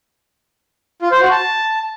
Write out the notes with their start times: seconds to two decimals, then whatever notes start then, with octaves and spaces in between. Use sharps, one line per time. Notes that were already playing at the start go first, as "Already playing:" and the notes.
1.02 F4
1.12 C5
1.21 F#4
1.31 A5